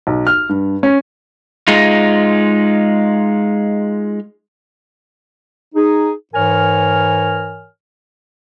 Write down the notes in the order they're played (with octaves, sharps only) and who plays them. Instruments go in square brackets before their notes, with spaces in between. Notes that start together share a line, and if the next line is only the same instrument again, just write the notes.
[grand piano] B1
F6
G2
C#4
[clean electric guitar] G#3 D#4 F4
[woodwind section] D#4 G#4
G#2 E3 A#4 C#5 G#5 F6